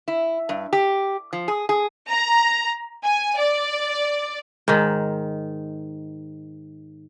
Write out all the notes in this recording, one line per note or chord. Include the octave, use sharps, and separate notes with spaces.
E4
G2
G4
F3
G#4
G#4
A#5
G#5
D5
G#2 D#3